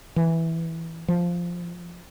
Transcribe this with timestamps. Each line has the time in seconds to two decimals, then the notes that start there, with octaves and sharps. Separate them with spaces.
0.16 E3
1.08 F3